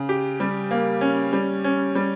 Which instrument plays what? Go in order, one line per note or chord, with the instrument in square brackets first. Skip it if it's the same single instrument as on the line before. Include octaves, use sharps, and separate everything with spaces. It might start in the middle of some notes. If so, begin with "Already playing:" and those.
Already playing: [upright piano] C#3
G4
G3
A#3
C#4
G3
C#4
G3